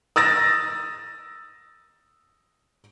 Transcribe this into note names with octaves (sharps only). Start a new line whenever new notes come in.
D#6 E6 A6 A#6